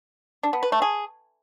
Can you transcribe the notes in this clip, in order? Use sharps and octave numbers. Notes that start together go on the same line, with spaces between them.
D4
B3
B4
A3
G#4